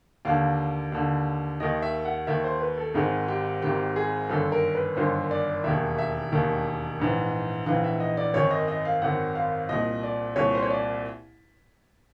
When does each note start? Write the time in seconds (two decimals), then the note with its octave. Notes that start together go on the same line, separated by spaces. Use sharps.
0.25 D#2 D3 F5
0.92 D#2 D3
1.60 D#2 D#3 D#5
1.82 E5
2.05 F#5
2.27 D#2 D#3 E5
2.44 C5
2.61 B4
2.78 A4
2.94 G#1 G#2 D#3 G#4
3.28 G4
3.62 G#1 G#2 D#3 G4
3.96 G#4
4.29 G1 F#2 D#3 A4
4.52 A#4
4.75 B4
4.97 G1 F#2 D#3 C5
5.31 D5
5.64 E1 D#2 D#3 E5
5.98 E5
6.32 E1 D#2 D#3
6.99 A#1 G#2 E3
7.66 A#1 G#2 E3 F5
7.84 E5
8.00 D#5
8.17 D5
8.34 G#1 F#2 D#3 C#5
8.51 D#5
8.68 D#5
8.85 F5
9.02 G#1 F#2 D#3 F#5
9.35 F5
9.69 C2 A#2 D#5
10.03 D5
10.36 C2 A#2 C#5
10.55 C5
10.63 C#5
10.70 D5